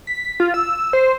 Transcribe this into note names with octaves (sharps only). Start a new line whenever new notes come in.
B6
F4
E6
C5